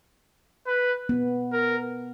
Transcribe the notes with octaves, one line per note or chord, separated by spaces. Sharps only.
B4
B3
A#4